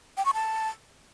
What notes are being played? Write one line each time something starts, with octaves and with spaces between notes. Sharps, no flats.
G5
C#6
A5